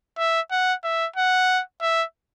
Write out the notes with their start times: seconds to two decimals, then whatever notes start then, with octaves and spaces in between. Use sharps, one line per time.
0.18 E5
0.51 F#5
0.84 E5
1.16 F#5
1.81 E5